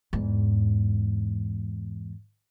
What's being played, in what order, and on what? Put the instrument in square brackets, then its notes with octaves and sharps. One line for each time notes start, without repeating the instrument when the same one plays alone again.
[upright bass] E2 G#2